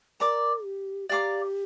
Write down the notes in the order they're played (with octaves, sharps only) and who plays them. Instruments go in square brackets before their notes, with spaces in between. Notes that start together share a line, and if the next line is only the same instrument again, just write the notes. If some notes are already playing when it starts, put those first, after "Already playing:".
[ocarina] A#4 [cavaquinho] D5 A#5 D6
[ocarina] G4
[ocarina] G4 [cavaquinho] D5 F5 A#5 D6